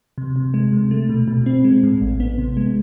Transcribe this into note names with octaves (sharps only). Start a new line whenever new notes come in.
C3
C3
G#3
C3
A3
B2
B2
C4
G#3
A2
A1
B3
C3
G#3